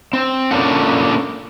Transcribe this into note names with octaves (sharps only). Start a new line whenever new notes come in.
C4
A#3 C#4 D4 F4 A4 F#5